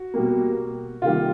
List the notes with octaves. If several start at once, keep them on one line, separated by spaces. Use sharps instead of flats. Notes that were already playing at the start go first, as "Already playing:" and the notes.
Already playing: F#4
B2 G3 A#3
C3 D#3 G3 A#3 F4